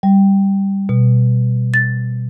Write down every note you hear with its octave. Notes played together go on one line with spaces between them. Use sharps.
G3
B2
A6